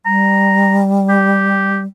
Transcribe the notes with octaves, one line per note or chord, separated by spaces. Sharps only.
G3 A#5
G4